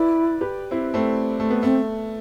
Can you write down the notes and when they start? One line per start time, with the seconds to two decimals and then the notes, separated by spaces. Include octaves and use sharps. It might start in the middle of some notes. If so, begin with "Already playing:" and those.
Already playing: E4 B4 D5
0.41 G4 B4
0.71 C4 E4
0.94 A3 C4
1.40 A3
1.50 B3
1.62 A3 C4